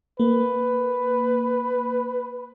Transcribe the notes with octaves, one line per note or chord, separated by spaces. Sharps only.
A#3 B4